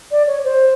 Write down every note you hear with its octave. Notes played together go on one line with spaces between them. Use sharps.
D5
C#5
C5